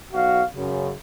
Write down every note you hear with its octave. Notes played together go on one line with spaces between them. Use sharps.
B1 F#4 F5
F#2 C#3